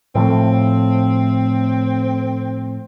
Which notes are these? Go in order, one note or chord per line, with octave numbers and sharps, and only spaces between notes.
A2 F3 A3 C4